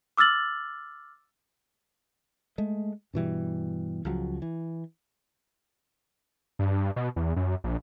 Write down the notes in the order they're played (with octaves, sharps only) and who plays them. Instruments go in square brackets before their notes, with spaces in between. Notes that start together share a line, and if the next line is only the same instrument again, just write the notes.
[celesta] D6 E6 F6 A6 F#7
[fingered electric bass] G#3 A3
G2 B2 E3 G3
C#2 F3 F#3
E3
[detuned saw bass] G2
B2
E2
F#2
A#1